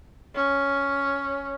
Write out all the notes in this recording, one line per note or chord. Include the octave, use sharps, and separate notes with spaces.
C#4